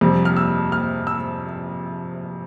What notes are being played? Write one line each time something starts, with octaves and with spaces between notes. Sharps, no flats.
F2 C3 G3
F6
E6
F6
E6